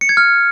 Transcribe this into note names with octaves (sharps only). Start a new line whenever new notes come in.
C#7
G#6
F6